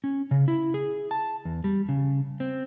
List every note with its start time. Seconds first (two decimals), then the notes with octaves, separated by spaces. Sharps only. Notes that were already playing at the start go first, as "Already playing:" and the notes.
0.04 C#4
0.31 C#3
0.48 E4
0.74 G#4
1.11 A5
1.45 E2
1.64 G3
1.89 C#3
2.40 C4